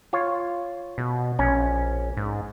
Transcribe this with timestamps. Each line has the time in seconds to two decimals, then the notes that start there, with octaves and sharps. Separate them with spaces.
0.13 F4 C#5
0.98 B2
1.39 A#1 C#4
2.17 G#2